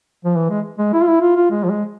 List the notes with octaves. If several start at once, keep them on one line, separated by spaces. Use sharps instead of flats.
F3
E3
G#3
G#3
E4
F4
E4
F4
F4
G#3
F3
G#3